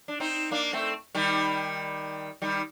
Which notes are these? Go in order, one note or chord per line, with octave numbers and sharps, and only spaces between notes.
D4
C4 D#4
A#3 D4
A3 C4
D#3 G3
D#3 G3